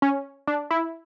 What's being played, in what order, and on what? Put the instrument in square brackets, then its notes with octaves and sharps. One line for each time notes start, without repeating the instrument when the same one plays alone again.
[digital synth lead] C#4
D4
E4